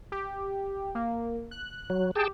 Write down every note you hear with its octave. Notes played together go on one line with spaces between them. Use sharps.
G4
A#3
F#6
F#3
G4 G#4 G5 A5